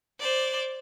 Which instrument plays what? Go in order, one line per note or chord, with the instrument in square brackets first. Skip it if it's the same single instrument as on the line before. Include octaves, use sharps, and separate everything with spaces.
[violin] C5 D5